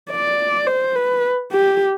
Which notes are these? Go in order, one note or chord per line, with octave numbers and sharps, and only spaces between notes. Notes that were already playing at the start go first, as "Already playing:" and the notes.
D5
C5
B4
G4